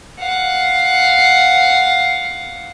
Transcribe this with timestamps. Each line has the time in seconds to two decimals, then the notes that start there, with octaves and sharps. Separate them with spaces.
0.20 F5 F#5